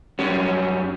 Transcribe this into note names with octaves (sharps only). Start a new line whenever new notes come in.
F#2 G3 C#4